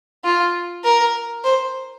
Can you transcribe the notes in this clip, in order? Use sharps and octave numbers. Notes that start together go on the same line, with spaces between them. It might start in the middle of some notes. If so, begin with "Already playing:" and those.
F4
A#4
C5